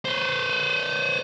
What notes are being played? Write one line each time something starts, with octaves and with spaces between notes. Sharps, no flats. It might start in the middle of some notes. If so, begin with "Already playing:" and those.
B4 C5